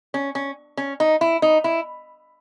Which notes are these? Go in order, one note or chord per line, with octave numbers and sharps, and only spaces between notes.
C#4
C#4
C#4
D#4
E4
D#4
E4